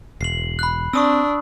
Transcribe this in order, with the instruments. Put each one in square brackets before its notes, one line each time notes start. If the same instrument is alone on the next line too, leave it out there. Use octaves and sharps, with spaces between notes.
[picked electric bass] E1 [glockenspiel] C7 F#7
[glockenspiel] B5 F#6
[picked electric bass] C4 [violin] D4 [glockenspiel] C#6 D#6 E6